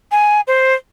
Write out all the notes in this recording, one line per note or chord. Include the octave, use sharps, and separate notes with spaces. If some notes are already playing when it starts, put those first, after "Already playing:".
G#5
C5